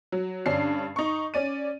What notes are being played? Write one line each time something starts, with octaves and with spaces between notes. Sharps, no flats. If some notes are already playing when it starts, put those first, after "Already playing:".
F#3
G2 D3 C#4 D4 C7
D#4 C#6
C#4 D5 D#7